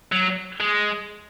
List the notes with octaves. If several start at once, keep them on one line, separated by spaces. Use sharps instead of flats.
F#3
G#3